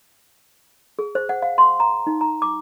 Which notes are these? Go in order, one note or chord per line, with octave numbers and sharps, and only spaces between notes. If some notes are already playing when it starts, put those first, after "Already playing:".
G#4
C5
F#5
F5
C6
A#5
D#4
A#5
D6